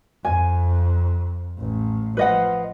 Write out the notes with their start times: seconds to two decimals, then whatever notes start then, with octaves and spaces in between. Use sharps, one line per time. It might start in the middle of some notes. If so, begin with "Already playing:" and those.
0.25 F2 G#5
1.59 A1 A2
2.17 F3 B4 D#5 F#5